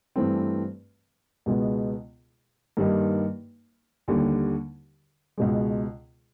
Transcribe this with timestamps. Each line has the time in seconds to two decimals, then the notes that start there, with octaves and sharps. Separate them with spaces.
0.16 G2 E3 A3 C4
1.46 C#2 B2 G#3 B3
2.77 G2 D#3 G3 A#3 D#4
4.08 D#2 D3 G3
5.38 C#2 B2 G#3